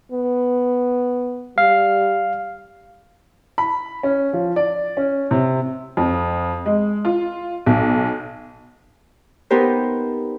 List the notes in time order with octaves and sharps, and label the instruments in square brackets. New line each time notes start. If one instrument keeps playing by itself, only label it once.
[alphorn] B3
[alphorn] G3 [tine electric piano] F5
[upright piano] B5
C#4
F3
D5
C#4
C3
[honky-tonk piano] F2
G#3
F4
B1
[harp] B3 D#4 G4 A#4 C5